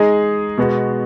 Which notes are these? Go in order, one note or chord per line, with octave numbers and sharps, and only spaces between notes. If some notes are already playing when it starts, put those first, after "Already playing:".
Already playing: G#3 D#4 G#4 D#5
B2 G#3 B3 F#4